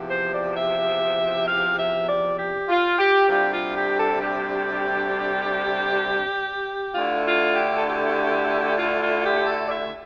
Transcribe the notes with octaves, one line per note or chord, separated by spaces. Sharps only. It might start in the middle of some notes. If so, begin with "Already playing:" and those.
Already playing: E2 C3 F3
C5
D5
E5
F5
E5
D5
G4
F4
G4
D2 C3 G3 D4 F4 G4
F4
G4
A4
G4
D2 D3 A3 E4 F4
F4
G4
A4
G4
F4
F4
G4
A4
D5
E5